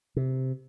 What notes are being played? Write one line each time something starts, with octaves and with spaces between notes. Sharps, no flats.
C3